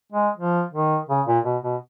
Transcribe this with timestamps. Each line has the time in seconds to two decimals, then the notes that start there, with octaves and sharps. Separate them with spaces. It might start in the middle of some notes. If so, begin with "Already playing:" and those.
0.12 G#3
0.37 F3
0.73 D#3
1.09 C#3
1.27 A#2
1.45 B2
1.63 B2